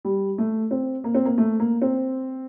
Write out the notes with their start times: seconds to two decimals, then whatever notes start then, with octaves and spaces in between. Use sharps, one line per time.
0.05 G3
0.38 A3
0.71 C4
1.04 A#3
1.14 C4
1.25 A#3
1.38 A3
1.60 A#3
1.82 C4